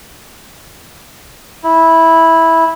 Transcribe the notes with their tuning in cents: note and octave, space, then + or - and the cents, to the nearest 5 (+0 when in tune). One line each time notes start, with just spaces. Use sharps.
E4 -10